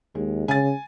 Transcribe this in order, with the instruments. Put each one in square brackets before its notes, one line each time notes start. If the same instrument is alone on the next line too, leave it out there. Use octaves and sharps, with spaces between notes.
[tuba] D#2 [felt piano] G#3
[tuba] C#3 [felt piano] G#5 A6